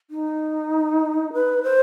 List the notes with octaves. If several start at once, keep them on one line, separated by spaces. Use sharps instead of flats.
D#4
B4
C5